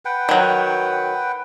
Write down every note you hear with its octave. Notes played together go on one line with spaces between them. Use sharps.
B4 F#5 G5
D#3 F#3